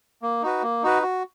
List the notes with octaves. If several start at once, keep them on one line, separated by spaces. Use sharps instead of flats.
A#3
D#4 F#4 B4
A#3
D#4 F#4 B4
F#4